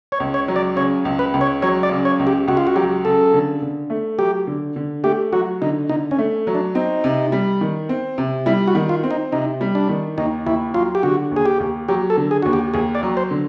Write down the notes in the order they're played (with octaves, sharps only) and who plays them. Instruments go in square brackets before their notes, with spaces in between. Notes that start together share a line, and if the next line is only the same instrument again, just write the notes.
[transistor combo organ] C#5
[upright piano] C#2
[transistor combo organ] C#5
[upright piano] F#3
[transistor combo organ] D5
[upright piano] C#3 [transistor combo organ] C#5
[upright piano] C#2
[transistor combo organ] B4
[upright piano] C#2
[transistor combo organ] C#5
[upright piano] F#3 [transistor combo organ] C#5
[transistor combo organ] D5
[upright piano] C#3
[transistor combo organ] C#5
[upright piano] C#2
[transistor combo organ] G4
[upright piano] C#2 [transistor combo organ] F#4
[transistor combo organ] F4
F#4
[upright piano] F#3 [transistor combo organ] G4
[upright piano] C#3 [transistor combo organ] A4
[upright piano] D3
D3
A3
[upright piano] F#3 [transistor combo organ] G4
[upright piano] D3
D3
[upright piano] A3 [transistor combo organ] G4
[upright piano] F#3 [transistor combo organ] F#4
[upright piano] D3 [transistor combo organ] D#4
[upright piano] D3 [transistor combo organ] D#4
[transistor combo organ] C#4
[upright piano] A3
F#3
[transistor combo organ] D4
[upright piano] C4 [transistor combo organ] D#4
[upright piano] C3
G3
D#3
C4
C3
[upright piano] G3 [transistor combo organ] E4
[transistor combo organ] F#4
[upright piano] D#3
[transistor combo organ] F4
[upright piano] C4
[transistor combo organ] D#4
[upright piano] C3 [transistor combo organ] D#4
[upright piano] G3
[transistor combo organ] D4
[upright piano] D#3
[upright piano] D#2 [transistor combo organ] D#4
[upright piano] D#2 [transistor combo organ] E4
[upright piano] F#3 [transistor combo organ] F4
[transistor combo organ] G4
[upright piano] D3 [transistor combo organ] F#4
[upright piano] D#2
[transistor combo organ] G#4
G4
[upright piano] D#2
[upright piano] F#3 [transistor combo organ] G4
[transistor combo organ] A4
[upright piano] D3
[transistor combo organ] G#4
[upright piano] D#2 [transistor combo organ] F#4
[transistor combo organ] G4
[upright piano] D#2 [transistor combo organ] G#4
[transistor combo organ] D5
[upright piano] F#3
[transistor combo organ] C5
[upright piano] D3